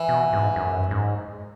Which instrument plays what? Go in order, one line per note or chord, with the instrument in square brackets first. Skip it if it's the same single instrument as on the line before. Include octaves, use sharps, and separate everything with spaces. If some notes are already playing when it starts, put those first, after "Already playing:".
Already playing: [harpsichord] E3
[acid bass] B2
G#2
F#2
G#2